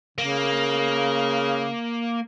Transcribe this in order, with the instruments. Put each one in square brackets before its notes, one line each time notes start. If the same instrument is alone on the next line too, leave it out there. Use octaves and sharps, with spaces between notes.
[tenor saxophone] C#3 [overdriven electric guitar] A#3